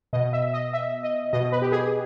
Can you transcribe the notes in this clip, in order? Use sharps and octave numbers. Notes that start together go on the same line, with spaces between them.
B2 D#5
E5
D#5
E5
D#5
B2 D#5
B4
G4
G#4